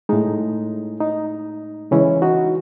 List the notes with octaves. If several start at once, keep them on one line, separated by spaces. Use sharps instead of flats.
A2 G#3 D#4
D#4
C#3 E3 G#3 C#4 E4
D#4 F#4